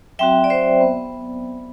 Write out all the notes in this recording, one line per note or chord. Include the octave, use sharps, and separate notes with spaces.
F#3 C4 F#4 E5 G5
D5
C5 E5
B3